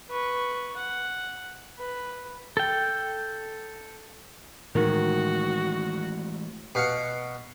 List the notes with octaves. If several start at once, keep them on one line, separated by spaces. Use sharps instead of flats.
B4 C#6
F#5
B4
A4 G5
A2 D#3 E3 G#3 F#4
B2 F5 F#5